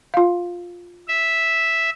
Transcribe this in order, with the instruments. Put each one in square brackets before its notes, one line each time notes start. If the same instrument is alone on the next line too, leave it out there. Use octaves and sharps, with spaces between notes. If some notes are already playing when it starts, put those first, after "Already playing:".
[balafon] F4 F5
[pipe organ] E5